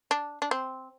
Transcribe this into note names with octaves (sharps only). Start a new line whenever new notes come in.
D4
D4
C4